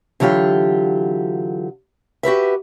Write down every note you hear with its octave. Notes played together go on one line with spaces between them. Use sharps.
D3 E3 F#3 F4 G4
F#4 G4 B4 E5